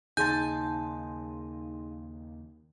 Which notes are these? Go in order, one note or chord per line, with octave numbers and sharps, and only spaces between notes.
D#2 C#3 D#4 G#4 G#5 A5 C6 G6